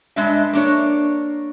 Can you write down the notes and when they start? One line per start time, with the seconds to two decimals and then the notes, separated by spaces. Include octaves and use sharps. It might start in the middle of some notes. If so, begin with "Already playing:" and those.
0.16 G2 G#3 D4 D#5 E5
0.53 A#3 D4 C#5